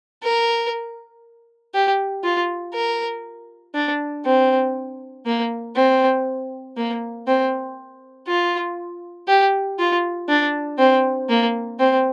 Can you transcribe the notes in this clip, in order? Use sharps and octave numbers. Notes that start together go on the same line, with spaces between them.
A#4
G4
F4
A#4
D4
C4
A#3
C4
A#3
C4
F4
G4
F4
D4
C4
A#3
C4